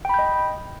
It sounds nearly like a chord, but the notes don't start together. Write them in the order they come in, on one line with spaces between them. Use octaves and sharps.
G5 B5 G6 D#5